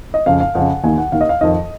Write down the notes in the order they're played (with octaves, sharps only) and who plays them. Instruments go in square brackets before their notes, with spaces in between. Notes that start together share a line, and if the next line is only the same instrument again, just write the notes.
[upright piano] D#5
F2 C#3 F5
F5
F2 C#3 F#5
D#2 D#3 G#5
F#5
D#2 D#3 F5
D#5
F5
F2 D#3 D#5